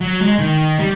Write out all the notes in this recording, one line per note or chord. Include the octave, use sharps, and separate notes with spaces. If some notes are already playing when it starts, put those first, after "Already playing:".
F#3
G#3
D#3
G3